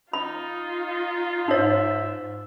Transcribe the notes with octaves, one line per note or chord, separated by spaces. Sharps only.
D#4 F4 B5
G#2 D#4 C#5 E5